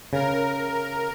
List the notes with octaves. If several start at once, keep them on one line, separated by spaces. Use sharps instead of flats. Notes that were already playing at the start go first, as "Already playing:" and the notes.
C#3 A#4